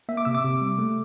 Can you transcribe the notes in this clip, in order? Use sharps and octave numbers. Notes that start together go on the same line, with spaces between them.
A#3 E5
D6
C3 E6
D6
C3
G3
A3